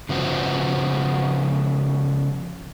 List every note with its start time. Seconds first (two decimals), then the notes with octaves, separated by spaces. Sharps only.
0.09 C#3 F3 B3 F#4 C5